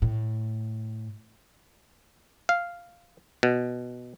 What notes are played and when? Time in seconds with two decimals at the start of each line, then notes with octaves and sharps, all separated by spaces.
0.02 A2
2.49 F5
3.43 B2